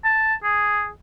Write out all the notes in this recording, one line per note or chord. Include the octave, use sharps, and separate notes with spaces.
A5
G#4